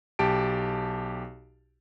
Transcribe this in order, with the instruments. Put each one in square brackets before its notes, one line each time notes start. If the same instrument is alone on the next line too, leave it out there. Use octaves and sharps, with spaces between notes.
[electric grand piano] B1 G4 A5 D7